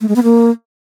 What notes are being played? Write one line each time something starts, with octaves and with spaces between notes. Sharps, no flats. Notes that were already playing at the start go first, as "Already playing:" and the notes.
A3
G#3
B3
A#3